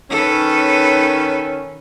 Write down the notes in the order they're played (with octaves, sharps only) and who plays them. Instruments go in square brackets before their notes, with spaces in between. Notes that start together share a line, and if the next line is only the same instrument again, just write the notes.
[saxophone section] D#3 C#4 [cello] A4 B4